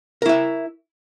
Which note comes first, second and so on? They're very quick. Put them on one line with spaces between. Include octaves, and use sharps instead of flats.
A#4 E4 E5